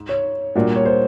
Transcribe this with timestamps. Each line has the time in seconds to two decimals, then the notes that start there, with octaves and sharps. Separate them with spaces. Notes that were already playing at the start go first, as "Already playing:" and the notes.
Already playing: G#2
0.09 C#5
0.55 A#2 G3 A#3 D4 F#4
0.76 C#5
0.85 C5